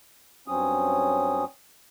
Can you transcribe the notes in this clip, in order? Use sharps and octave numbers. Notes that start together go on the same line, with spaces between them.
G2 F#3 C4 C#4 D#6